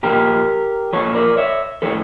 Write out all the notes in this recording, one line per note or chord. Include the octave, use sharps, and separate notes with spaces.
A#2 F3 G4 A#4
A#2 F3 A4 C#5
A#4 D5
C#5 E5
A2 F3 A4 C#5